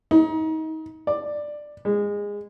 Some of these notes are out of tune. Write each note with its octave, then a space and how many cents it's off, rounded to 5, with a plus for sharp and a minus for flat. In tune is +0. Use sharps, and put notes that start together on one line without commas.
D#4 +30
D5 +10
G#3 -20